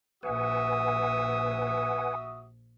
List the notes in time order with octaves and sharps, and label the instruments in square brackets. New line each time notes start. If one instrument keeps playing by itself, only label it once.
[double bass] A#1 [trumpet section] F#4 E5 D#6 [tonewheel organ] B4 F#5 G#5